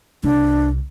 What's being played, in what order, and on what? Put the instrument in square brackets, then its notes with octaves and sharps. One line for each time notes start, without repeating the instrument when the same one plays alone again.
[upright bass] C2 [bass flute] D4